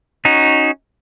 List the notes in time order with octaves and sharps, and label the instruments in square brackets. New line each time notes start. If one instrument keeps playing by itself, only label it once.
[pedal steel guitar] C#4 D#4 F#4